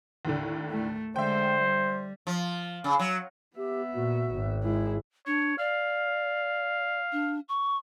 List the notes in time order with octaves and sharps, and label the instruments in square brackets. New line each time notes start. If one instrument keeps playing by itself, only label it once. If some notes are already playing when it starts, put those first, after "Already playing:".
[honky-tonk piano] D#2 A2 D3
[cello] A3
[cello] D3 G#3 [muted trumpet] C5 [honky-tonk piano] E5 G5
[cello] G3
[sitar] F3
C#3
F#3
[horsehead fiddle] B3 E5 [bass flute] G4
[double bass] A#2 [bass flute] F#4
[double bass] G#1
[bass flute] G#3 [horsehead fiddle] E4 G#4
[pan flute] D4 [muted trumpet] C#5
[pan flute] D5 [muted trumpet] F5
[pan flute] D4
C#6